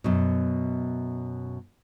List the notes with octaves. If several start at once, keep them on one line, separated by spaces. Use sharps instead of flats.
F#2 B2